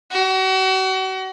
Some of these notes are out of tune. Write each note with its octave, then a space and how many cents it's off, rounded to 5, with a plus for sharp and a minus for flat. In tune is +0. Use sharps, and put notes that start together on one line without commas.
F#4 +35